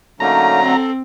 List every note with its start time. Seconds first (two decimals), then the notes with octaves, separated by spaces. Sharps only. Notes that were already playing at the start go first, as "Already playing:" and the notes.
0.20 D3 F#3 A3 A#3 C#4 D#4 A#5
0.61 C4 A4